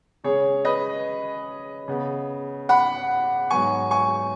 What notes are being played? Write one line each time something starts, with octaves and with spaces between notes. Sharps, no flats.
C#3 G#3 C#4 G#4 C#5
B4 D#5
C#3 B3
F#5 B5
G#2 F#3 B3 G#5 C#6
G#5 C#6